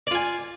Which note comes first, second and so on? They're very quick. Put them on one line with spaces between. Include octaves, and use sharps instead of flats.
D5 F4 G#5